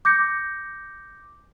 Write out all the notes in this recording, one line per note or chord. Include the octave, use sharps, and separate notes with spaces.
D6 G6 A#6 C#7